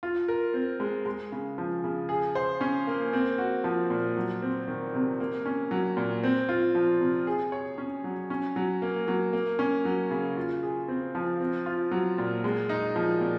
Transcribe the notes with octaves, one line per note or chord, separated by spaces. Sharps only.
F4
A#4
C4
G#3
G#3
C#3
F3
C#3
G#4
C5
C#4
A#3
C4
F#4
F3
A#2
F#3
C4
D#3
C3
A#3
C#4
F#3
A#2
C4
F4
F3
C3
G#4
C#5
C#4
F#3
C#4
F#3
A#3
F#3
A#3
C#4
F#3
C#3
F4
G#4
C4
F3
C4
F4
F#3
A#2
G#3
D#4
F3
A#2